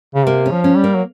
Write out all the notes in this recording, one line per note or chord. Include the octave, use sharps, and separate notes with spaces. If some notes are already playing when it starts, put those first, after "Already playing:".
C#3
C3 A#3
C#4
F3
C#4
G3
A#3
F#3